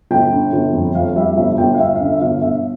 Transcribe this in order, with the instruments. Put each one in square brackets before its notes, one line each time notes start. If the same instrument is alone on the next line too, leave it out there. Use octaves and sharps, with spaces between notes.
[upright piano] G1 G5
D3
G1
F2
F2 F5
G3 E5
G1 E5
G1 G5
F5
G1 E5
F5
D3 E5
E5
G1 F5
G1 E5